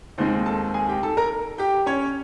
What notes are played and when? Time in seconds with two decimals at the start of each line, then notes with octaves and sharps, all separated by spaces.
0.18 D#2 D#3 G#3 C4 D#4 C5 C6
0.46 A4 A5
0.74 G#4 G#5
0.88 G4 G5
1.03 A4 A5
1.17 A#4 A#5
1.58 G4 G5
1.86 C#4 C#5